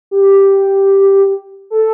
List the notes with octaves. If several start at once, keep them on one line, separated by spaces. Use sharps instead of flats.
G4
A4